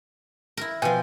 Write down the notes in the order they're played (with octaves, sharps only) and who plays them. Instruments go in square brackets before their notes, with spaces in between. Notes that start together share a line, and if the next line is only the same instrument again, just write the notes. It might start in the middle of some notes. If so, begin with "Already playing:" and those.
[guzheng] E4 A#4
[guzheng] B2 F3 [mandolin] G5 G#5